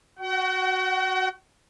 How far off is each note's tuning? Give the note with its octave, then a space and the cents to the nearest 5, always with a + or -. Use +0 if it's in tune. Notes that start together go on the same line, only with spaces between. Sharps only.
F#4 +0 F#5 +45